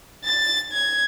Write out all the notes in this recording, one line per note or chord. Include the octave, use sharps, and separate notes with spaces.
A6
G#6